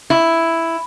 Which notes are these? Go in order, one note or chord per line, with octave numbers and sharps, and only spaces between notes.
E4